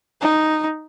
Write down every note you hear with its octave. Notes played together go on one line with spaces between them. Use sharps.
D#4